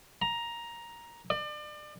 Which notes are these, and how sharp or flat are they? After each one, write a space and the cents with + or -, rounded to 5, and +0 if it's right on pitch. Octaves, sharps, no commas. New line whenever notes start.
A#5 +10
D5 +35